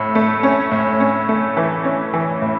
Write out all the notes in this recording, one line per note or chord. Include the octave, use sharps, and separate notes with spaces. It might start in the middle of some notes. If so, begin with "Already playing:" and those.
Already playing: A2 A3
A3
C#4
A2
C#4
A3
E3
C#4
E3
A2